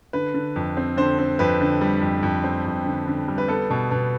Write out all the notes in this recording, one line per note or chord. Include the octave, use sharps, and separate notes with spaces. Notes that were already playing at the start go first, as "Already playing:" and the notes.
D3 B4
D3
F2
C4
D3 C5
C4
F2 B4
D3
G3
F2
F2
C4
F2
D3
D3
G3
B4
B3 A4
B2
B2